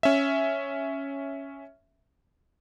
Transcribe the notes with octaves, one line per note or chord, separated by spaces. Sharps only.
C#4 E5